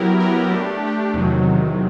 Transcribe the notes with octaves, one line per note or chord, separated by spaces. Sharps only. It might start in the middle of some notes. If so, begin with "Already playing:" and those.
Already playing: F#3 B3 E4 G4 A#4
F#3 B3 E4 G4 A#4
A3 D4 G4
A3 D4 G4
E2 C3 D#3 F#3
E2 C3 D#3 F#3